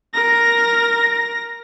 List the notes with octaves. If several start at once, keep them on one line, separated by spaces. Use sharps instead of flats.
A#4 A#6